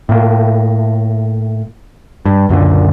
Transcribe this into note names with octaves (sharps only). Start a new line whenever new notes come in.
A2 A#3
G2
C#2 F#2 A#2 D3